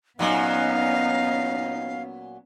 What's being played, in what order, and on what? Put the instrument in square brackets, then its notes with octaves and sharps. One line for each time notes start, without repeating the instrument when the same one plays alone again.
[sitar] A#2 F#3 [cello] B3 C#4 [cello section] D#4 [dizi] F5